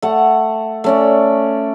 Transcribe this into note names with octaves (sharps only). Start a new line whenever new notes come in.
A3 F#5
A3 C#4 D5